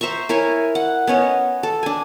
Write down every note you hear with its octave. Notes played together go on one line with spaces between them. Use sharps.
C5 E5 A#5 C#6
E4 A#4 C#5 G#5
F#5
B3 C#4 C#5 D#5
A4
D4 G#5